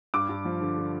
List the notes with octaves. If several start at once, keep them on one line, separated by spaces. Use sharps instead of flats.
G2 D6
G2
F3
D3
D3